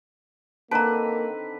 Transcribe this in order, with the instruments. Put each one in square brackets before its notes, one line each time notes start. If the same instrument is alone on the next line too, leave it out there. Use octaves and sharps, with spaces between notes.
[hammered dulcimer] D3 D#3 C4 [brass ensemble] A#3 [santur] B4 [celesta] A5 A#5